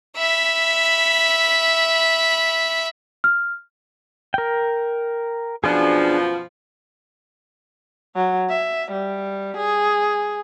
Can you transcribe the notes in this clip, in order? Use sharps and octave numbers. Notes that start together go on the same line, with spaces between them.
E5 B5
F6
A#4 G5
F#2 B2 F3 D4 G#4
F#3
E5
G3
G#4